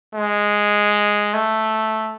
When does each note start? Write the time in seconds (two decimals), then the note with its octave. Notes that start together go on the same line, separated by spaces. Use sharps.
0.15 G#3
1.34 A3